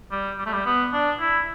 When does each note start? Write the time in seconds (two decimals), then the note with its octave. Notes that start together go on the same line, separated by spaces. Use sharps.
0.12 G3
0.38 G3
0.46 A3
0.53 G3
0.66 B3
0.93 D4
1.20 E4